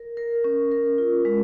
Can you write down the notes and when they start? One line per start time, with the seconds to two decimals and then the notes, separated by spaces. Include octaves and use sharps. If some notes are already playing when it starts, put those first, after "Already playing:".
Already playing: A#4
0.17 A#4
0.44 C#4
0.71 A#4
0.98 F4
1.25 G#3